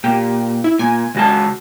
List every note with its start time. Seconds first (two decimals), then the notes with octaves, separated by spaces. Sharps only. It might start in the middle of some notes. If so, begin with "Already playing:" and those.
0.04 A#2 G4
0.64 E4
0.79 A#2 G#5
1.15 C#2 F#4 A5